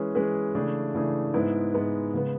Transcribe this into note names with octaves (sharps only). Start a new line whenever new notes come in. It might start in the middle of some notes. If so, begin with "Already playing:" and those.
Already playing: E3 G#3 C#4 G#4 B4
E3 G#3 C#4 G#4 B4
C#3 E3 A3 D4 G#4
C#3 E3 A3 D4 G#4
G#2 G#3 B3 E4
G#2 G#3 B3 E4
C#3 G#3 B3